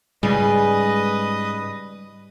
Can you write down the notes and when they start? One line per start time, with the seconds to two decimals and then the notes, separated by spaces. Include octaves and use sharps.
0.23 G#2 C#3 G3 G#3 G#4 B4 D#5 D#6